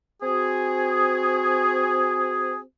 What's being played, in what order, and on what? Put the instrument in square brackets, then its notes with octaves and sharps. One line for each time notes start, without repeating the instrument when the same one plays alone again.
[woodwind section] C4 F#4 G#4